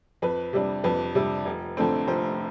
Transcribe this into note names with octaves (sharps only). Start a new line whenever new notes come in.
F2 B4
C3 G3 D4
F2 B4
C3 G3 D4
F1
F2 D3 A3 C4
F1 C5